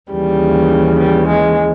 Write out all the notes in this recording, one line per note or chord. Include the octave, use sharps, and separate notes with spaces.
D#2 C#3 E3 G3
G3
G#3